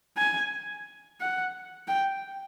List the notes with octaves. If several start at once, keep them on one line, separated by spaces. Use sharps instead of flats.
G#5
F#5
G5